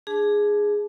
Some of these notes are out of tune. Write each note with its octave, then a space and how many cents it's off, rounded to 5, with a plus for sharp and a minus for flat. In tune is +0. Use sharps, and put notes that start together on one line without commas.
D4 +10 G#4 +0 A5 -30